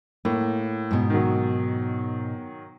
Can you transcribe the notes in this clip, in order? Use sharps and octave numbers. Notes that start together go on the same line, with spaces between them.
A2 A#3
G#2 B2
D#3 F#3